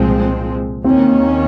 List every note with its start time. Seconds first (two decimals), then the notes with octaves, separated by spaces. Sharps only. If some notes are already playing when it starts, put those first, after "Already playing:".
Already playing: C2 A#2 F3 G#3 C4
0.84 D#2 D#3 A#3 C4 C#4